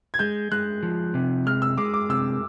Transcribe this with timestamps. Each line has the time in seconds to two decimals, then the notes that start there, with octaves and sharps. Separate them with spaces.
0.14 G#6
0.19 G#3 G6
0.52 G#3 F#6
0.83 F3
1.14 C3
1.46 G#3 F6
1.62 E6
1.78 G#3 D6
1.94 D6
2.09 C3 E6